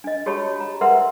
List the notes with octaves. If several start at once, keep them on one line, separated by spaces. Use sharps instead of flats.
D4 D#5
F#4 G4 C#5 A5 B5
A#5
A#4 B4 E5 F#5 C6